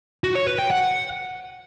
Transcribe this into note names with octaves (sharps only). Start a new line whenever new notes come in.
F#4
C#5
B4
G5
F#5